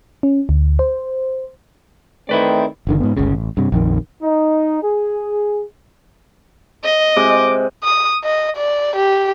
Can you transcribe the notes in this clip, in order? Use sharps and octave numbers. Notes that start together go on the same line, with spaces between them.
C#4
D2
C5
D#3 A3 C4 E4 B4 D5
F#1 D3 D#3
G#2 B3
G1 C#2 C#3
A1
G2 C3
A#1 F2 D#3
D#4
G#4
D#5
C3 G#3 D6
D#6
D#5
D5
G4